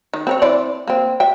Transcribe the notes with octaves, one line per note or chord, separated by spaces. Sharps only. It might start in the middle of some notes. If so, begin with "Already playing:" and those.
D#3
C4 A#4 C#5
E3 C4 D5
A#3 C4
E5 G5